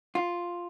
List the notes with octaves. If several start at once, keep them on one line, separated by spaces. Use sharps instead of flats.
F4